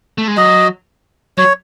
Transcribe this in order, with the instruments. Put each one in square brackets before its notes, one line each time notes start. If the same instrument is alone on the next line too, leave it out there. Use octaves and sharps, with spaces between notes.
[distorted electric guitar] A3
G#3
[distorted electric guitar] F#3 [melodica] D#5
[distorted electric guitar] F#3 [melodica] C#5